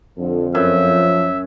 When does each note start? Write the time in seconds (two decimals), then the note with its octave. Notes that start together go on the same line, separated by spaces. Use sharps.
0.18 F2 D3 F3 A4
0.55 F#2 F3 E5